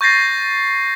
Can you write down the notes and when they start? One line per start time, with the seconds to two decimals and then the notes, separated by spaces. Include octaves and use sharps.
0.01 C#6 G6 A6 A#6 C7